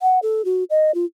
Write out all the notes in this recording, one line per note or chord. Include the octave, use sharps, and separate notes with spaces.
F#5
A4
F#4
D#5
F4